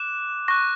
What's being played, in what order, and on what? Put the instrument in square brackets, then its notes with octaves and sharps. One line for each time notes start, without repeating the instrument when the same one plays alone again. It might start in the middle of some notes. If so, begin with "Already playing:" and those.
Already playing: [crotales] D6 F#6 E7
C#6 F#6 A#6